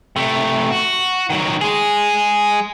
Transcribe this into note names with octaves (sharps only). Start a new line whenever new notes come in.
C3 A3
F#4
D#3 F#3
G#3 G#4